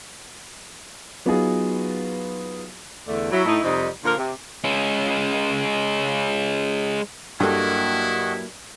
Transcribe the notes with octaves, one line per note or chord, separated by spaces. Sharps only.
F#3 B3 D#4 F4 F#4 G#4
E2 D3 A3
F#3 E4
A2 D#4 E4
F2 C3 G3 D#4
A#2 D3 F3 A#3 F4 A#4
C3
G#3 C#4
G2 F#3 A#3 E4 A4 D#5 F#5 C#6